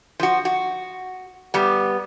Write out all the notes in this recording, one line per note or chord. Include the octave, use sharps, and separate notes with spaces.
F3 F#4
F#4
G3 B3